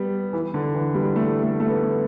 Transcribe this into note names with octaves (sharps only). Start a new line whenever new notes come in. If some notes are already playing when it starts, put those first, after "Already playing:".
Already playing: G3 B3
E3
D3
E3
G3
A3
A3
A3
B3